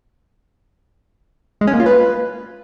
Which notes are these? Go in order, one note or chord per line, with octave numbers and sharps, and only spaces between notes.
G#3
C#4
A#3
F4
B4